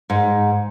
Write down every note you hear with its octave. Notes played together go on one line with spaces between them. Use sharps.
G#2